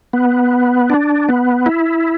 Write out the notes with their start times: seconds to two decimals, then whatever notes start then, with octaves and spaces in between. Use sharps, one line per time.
0.13 B3
0.90 D4
1.29 B3
1.66 E4